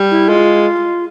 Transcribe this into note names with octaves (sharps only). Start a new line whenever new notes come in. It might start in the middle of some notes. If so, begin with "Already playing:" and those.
Already playing: G3
E4
G#3 F4